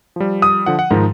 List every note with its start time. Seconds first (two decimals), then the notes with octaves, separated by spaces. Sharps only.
0.16 F3 G3
0.42 D#6
0.66 D3 F3 F#5
0.79 F#5
0.91 G#2 D#3 F3 D#4